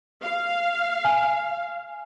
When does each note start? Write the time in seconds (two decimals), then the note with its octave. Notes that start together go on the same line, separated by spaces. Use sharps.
0.21 F5
1.05 G#5